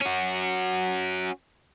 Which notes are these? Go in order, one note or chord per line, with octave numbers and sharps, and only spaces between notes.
C#4 F#4